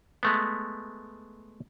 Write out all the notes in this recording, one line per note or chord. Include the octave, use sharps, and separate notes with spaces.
G#3 A3 B3